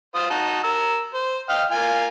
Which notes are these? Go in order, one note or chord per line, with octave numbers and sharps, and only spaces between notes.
F4 C5 D#6
D#4 F#4 A5
A#4 E6
C5
D#5 F5 G5
A#3 F4 G#5